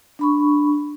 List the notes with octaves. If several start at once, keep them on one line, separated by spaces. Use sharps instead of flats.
D4 B5 C#6